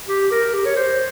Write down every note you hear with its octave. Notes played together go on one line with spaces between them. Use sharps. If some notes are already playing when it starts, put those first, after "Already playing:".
G4
A#4
G4
C#5
C5